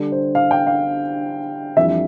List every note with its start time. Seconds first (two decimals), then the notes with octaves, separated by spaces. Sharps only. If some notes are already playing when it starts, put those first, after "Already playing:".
Already playing: D3 G3 D4
0.12 C5
0.35 F5
0.51 G5
0.67 F5
1.77 F2 E3 G3 D4 E5